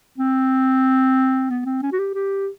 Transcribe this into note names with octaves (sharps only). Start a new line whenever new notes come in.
C4
B3
C4
C#4
F#4
G4
G4